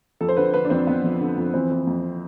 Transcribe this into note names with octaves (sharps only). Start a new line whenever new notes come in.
F2 A4
C5
D3 B4
D3 B4
D4
F2 C4
F2 B3
F3
D3
F2
E3 C4
E3
F2